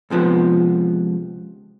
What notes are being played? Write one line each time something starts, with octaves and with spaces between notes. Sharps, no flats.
C#2 C3 F3 B3